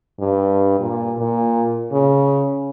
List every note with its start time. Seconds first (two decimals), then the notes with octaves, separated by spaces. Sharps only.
0.20 G2
0.80 A#2
1.18 A#2
1.92 C#3